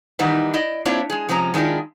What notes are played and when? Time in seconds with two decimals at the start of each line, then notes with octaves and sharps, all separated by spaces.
0.19 D#3 E3 G3 B3 D#4 E4
0.54 E4 D5 D#5
0.85 A#3 C4 D4 E4 F4 C#5
1.10 G#3 G#4
1.29 C3 F3 G#3 C#4 A#5
1.54 D#3 G#3 B3 D4 E4 F4